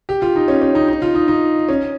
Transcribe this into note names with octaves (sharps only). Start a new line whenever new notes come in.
G4
F4
D#4
C#4
C#4
D#4
D#4
F4
D#4
D#4
C#4